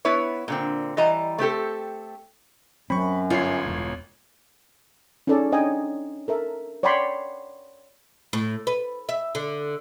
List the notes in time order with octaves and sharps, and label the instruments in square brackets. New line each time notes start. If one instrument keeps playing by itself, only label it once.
[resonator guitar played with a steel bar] B3 E4 B4 C#5
A#2 D3 C4
E3 G3 D#5 A#5
A3 C4 G4 A4
[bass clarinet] F#2 [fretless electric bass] F#3 C4 [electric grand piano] B5 C#6
[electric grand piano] G1 C#5 C7 [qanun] F4
[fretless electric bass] E1
[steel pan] C#4 D#4 G#4 A4 D5
D4 C#5 D#5 G5 G#5
A4 A#4 E5
C#5 D5 F#5 G5 B5 C6
[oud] A2
B4
E5
D3